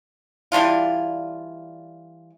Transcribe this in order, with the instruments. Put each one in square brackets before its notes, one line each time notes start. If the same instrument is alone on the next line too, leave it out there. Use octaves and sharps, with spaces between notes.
[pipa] E3 G3 D4 F4